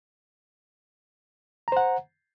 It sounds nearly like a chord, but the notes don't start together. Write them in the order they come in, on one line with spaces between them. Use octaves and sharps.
A#5 C5 F#5